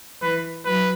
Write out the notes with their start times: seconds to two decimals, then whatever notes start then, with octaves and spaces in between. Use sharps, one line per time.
0.22 E3 B4
0.65 F#3 B4